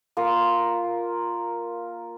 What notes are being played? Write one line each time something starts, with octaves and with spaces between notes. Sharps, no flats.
A#3 F4 A#4